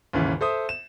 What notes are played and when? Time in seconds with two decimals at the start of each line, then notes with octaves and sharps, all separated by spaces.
0.13 D#2 G#2 C#3 E3
0.41 A4 C5 E5 D#6
0.69 E7